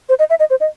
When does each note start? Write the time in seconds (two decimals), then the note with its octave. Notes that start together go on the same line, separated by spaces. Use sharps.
0.09 C5
0.19 D#5
0.30 E5
0.40 D#5
0.50 C5
0.60 D#5